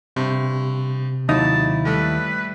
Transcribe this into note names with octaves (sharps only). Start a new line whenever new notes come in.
G2 C3 C5
D#2 F#3 D#4 E4 A5 D#6
G3 A3 A4 B4